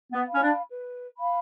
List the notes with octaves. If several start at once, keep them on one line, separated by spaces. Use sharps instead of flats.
B3
F5 B5
C#4
D4
B4
F5 B5